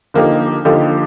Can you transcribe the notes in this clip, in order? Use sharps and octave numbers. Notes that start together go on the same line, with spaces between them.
D3 F3 A#3 D#4 G4
D3 F3 A#3 D#4 G4